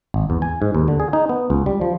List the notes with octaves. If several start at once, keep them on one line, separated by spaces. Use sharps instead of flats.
G#1
E2
G#5
G#2
D#2
D3
G#4
D#4
B3
C#2
G3
F3